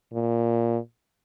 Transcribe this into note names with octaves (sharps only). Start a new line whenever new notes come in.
A#2